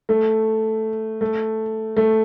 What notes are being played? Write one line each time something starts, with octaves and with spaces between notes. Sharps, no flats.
A3
A3
A3